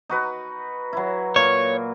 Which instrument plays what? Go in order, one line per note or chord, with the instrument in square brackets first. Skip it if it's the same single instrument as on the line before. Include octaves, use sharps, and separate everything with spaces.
[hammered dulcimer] D#4 F#4 B4
F#3 E4
[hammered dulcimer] A#2 [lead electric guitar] C#5